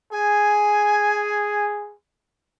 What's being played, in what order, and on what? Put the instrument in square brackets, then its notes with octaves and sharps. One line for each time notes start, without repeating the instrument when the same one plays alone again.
[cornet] G#4 [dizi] G#5